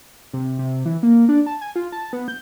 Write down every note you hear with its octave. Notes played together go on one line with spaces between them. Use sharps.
C3
C3
E3
A#3
D4
A5
G#5
F4
A5
B3
G6